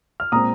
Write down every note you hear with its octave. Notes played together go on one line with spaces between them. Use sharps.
F6
A#2 G#3 C4 A#5 D#6